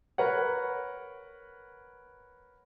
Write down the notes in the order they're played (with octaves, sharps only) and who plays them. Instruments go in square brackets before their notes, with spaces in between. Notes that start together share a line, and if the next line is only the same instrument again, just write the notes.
[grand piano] A#4 B4 C#5 F#5